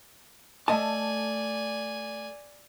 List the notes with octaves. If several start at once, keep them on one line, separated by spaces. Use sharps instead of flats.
A3 D5 D#5 G#5 A5